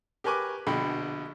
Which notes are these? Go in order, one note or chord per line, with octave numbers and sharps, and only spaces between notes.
G4 A#4 B4 G#5 C#6 D6
A#1 B2 D3 G5 B5